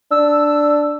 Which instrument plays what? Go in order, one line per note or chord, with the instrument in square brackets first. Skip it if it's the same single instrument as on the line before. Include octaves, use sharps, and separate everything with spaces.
[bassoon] D4 [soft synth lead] E6